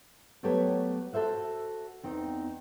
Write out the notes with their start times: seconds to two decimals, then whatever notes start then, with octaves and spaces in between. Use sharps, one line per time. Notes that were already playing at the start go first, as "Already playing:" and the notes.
0.43 F#3 A3 B3 G4 A4 C#5
1.13 F#4 A4 A#4 C5 E5 F#5
2.03 E2 C4 D#4